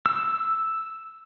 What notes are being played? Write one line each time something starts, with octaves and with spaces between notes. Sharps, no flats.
E6